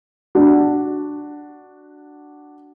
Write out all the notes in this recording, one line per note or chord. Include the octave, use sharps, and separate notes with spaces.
D4 F#4